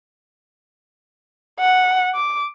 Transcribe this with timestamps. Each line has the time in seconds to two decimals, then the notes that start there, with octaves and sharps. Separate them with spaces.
1.60 F#5
2.15 D6